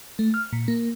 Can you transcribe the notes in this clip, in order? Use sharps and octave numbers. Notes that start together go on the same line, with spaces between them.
A3
F6
A#2
A#3